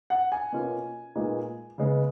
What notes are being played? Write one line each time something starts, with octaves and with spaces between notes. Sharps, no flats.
F#5
G#5
B2 A#3 C#4 F4
A#2 G#3 B3 D#4
C#3 G#3 B3